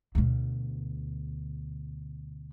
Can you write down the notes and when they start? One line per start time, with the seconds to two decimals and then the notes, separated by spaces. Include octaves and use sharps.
0.15 D2 B2